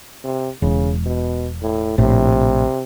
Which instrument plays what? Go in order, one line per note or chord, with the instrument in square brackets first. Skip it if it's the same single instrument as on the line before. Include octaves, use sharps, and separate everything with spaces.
[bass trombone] C3
[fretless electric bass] E1 [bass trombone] C#3
[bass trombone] B2
A2
[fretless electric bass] A#1 A2 [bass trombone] C3